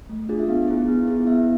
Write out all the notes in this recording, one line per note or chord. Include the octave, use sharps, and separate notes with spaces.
A3
D4 F4 G#4
E5
B3 F5
E4 G#4
B3
E4 G#4
B3 E5